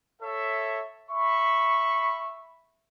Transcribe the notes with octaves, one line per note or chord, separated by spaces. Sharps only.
A4 C#5 E5
E5 B5 C#6